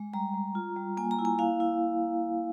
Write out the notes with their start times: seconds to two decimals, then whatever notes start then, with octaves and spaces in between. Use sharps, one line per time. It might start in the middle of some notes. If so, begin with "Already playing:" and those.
Already playing: G#3
0.14 G3 A#5
0.34 G3
0.55 F4
0.76 G3
0.97 A#3 G#5
1.11 A#5
1.19 E4
1.25 G#5
1.39 E4 F5
1.60 E4